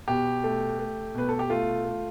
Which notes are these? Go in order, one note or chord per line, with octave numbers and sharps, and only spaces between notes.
B2 G4
A3
A3
B2 B4
A4
G4
A3 F4
A3